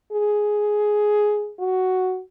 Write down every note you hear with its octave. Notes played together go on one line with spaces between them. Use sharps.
G#4
F#4